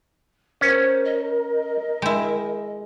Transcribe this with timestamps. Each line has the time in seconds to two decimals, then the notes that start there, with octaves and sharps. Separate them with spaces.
0.61 C#4 A#4 C5
1.04 D#5
2.02 G#3 E4 G5